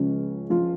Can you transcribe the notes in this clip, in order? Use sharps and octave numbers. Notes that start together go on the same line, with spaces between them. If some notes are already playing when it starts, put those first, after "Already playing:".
Already playing: C#2 C#3 F3 C#4
F3 F4